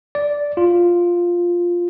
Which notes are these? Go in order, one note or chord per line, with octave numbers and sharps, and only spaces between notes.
D5
F4